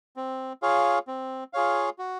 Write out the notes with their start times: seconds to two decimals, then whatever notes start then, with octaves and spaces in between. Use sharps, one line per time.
0.16 C4
0.62 F4 G#4 C#5 F5
1.07 C4
1.53 F4 G#4 C#5 F5
1.98 F#4